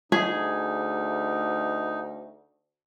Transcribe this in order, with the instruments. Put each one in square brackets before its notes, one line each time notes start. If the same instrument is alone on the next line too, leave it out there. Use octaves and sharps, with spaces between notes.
[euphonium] D2 [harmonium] D#4 [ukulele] G#4